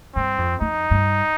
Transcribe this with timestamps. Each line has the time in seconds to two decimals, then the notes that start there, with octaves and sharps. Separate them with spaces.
0.15 G2 C4
0.38 F2
0.61 F2 D#4
0.91 G2